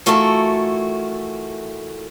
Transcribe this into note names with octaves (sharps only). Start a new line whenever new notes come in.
E3 A3 F4 F#4 A4 A#4